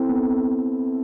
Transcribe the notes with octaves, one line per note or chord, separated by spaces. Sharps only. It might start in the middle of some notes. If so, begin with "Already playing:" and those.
Already playing: C4 E4 A4
B3